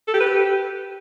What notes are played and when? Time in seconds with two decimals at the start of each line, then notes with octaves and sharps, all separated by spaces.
0.08 A4
0.14 G4
0.20 B4
0.26 G4